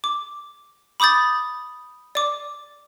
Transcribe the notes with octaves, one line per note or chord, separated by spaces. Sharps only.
D6
B5 D6 D#6 G6 A6
D5 D6